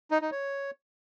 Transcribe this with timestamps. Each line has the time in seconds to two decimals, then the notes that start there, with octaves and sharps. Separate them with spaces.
0.11 D#4
0.21 D#4
0.32 C#5